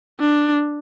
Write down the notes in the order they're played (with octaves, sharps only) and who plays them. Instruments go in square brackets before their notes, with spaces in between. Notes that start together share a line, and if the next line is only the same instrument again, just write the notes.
[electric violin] D4